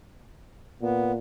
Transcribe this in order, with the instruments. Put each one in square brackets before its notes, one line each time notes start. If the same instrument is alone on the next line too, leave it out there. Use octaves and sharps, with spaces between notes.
[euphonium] A#2 [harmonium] B3